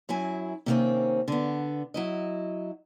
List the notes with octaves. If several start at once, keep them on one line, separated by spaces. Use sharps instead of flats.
F#2 F#3 E4 G#5
C3 D#3 G3 A#3 C4 C#4
D3 B3
F#3 E4 D#5